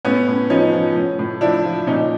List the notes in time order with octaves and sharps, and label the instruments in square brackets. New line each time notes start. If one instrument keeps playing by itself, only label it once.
[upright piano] A2 B3 C#4
A2
F3 C#4 D#4
F3
A2
A2
F3 D4 E4
F3
A#2 C#4 D#4